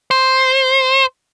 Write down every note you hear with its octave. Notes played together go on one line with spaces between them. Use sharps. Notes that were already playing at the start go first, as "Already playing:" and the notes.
C5